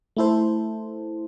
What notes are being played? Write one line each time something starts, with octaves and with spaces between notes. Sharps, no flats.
A3 E4 A4 C5